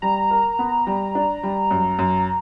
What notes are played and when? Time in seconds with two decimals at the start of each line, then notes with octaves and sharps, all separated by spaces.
0.02 G3 A#5
0.31 A#4
0.59 B3
0.87 G3
1.15 D4
1.43 G3
1.71 F#2
1.99 F#2